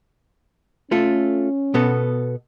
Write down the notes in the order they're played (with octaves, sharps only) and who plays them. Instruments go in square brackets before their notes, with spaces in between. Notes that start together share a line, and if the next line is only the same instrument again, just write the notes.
[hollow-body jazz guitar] A3 F4 A4 [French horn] C#4
[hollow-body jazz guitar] B2 B3 A4